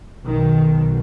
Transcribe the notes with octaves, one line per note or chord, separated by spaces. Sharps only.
B1 B2 D#3